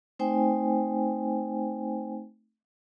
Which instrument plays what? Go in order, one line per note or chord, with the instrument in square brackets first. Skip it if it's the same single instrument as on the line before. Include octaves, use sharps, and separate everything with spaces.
[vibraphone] A3 C4 D#4 C5 G5 G#5